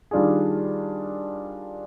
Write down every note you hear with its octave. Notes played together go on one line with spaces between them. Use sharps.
D#3 G3 D4 F4 G#4